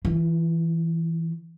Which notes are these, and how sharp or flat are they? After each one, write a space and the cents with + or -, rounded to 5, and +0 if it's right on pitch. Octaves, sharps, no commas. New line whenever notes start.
E3 +0 F4 -45